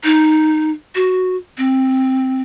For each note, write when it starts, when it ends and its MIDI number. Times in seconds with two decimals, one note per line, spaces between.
0.04 0.71 63
0.95 1.36 66
1.58 2.42 60